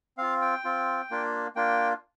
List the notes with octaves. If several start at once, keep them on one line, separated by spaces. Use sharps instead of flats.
C4 F4 F5
G5
C4 F4
A#3 D4 F4
A#3 D4 F4 G5